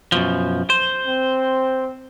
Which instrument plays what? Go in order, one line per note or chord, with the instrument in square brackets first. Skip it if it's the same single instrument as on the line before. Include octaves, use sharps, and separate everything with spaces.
[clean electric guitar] F#2 B2 F3
C5
[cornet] C4